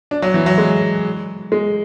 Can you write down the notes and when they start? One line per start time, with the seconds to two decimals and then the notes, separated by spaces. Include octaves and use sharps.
0.11 D4
0.22 F#3
0.34 E3
0.46 F#3
0.58 G#3
1.52 G#3